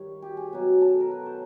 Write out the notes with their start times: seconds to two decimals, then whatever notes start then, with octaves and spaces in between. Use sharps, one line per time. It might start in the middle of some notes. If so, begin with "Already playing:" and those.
Already playing: G2 D#3 G3 C#5
0.22 G4
0.37 G#4
0.53 B2 F#3
0.82 A4
1.00 A#4
1.11 B4
1.26 C5